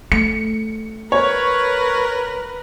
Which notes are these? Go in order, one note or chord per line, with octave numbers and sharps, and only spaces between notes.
A3 C#7
A#4 B4 C#5